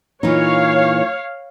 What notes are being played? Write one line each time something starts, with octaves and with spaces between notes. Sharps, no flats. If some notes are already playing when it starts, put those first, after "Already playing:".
A#2 E3 D#4 C#5 F5